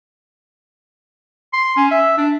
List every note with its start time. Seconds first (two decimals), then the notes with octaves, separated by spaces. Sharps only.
1.53 C6
1.77 C#4
1.91 E5
2.18 D4